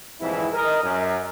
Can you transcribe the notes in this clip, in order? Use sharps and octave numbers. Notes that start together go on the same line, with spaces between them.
C2 F2 G#2 D3 E3 E4
A#4 D#5
F#2